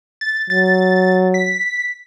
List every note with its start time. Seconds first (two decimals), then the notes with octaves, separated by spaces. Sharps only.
0.21 A6
0.50 F#3 A6
1.34 B6